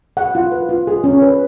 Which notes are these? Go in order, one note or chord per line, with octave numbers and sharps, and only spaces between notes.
G#4 F#5
F4
B4
F4
G#4
C#4
B4